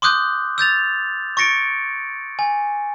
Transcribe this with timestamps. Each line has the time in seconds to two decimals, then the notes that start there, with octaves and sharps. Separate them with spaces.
0.02 C6 D6 D#6 F#6 G6
0.58 E6 G6 A6 F7
1.37 C#6 A6 A#6 C#7 D7
2.39 G#5